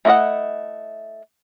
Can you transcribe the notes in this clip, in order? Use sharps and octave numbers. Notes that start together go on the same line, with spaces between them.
A3 E4 F#4 D#5 F#5